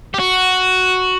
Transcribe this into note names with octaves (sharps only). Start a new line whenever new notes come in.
G4
F#4